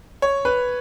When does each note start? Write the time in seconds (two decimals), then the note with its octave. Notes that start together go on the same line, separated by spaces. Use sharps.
0.22 C#5
0.45 B4